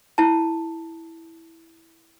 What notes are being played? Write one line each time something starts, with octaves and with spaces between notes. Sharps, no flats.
E4 A5